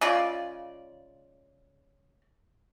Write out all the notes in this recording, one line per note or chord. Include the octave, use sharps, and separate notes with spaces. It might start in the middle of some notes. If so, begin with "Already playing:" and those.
C#3 G#3 F4 D5